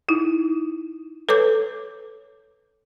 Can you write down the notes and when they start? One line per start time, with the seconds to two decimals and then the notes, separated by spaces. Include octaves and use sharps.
0.09 D#4 E4
1.29 A4 B4 C#5 D6 G6